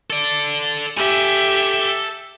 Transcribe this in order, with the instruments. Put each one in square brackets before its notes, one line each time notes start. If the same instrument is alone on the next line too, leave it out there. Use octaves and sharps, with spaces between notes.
[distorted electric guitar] A4 D5
[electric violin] G4 E5 [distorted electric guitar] A4 G#5